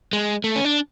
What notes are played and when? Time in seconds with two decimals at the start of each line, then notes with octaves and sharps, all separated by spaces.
0.13 G#3
0.44 A3
0.56 C#4
0.65 D4